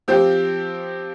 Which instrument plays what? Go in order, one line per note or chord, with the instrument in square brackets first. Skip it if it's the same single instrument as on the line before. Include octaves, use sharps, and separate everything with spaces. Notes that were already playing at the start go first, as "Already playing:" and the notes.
[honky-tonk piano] F3 C4 G4